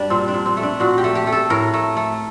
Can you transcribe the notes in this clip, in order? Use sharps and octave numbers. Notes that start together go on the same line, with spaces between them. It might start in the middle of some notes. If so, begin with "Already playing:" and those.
Already playing: G2 G3 D4
A#2 C4
D4
A#2
C4
A3
D4
A#2 F#4
G4
A3
G4
A3
A4
A2 A#4
A3
A3